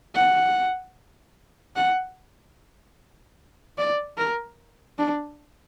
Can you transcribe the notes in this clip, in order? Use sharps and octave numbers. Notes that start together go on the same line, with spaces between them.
F#5
F#5
D5
A#4
D4